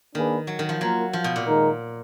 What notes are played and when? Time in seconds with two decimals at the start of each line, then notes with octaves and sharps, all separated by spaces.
0.15 D#3 A#3 D4 G#4 B4
0.47 F#3
0.59 D#3
0.69 F3
0.81 F#3 A#3 F4 A#4
1.13 F3
1.24 B2
1.36 A#2
1.46 D#3 G#3 D#4 A#4